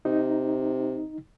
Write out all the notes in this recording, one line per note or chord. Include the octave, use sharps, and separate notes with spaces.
C3 D#4